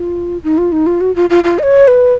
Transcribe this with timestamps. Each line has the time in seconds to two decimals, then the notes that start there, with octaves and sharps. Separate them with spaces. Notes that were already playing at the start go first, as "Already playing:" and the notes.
Already playing: F4
0.43 D#4
0.58 F4
0.72 D#4
0.86 F4
1.01 F#4
1.16 F4
1.30 F4
1.44 F4
1.59 D#5
1.63 C#5
1.88 B4